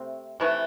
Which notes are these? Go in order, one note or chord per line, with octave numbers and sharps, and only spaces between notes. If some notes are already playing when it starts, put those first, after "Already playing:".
Already playing: C3 A3 C4
C3 E3 A3